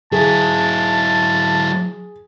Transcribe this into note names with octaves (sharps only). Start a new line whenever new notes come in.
F#3 E4 G#4 A5